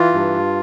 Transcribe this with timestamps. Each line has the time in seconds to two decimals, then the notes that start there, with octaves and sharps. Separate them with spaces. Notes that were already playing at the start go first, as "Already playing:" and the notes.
Already playing: E3 F4
0.14 G2